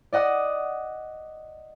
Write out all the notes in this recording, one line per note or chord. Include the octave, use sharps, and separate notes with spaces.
D5 D#5 F#5 D#6